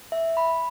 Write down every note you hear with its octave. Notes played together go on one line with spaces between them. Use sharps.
E5
B5